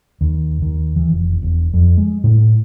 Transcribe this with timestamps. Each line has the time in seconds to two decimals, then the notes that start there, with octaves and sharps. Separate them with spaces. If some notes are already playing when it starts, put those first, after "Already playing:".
0.21 D#2
0.62 D#2
0.96 E3
1.11 F1
1.43 E1
1.74 F2
1.98 G#3
2.24 A2